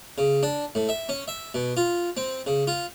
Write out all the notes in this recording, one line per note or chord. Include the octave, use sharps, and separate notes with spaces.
C#3
D4
A2
E5
C#4
E5
B2
F4
C4
C#3
F4